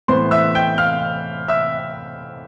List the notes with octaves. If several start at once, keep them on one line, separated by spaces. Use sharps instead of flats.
A2 E3 B3 C5 C6
E5 E6
G5 G6
F5 F6
E5 E6